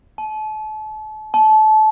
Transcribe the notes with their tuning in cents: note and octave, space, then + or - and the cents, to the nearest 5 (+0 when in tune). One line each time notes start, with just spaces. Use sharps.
A5 -35
A5 -25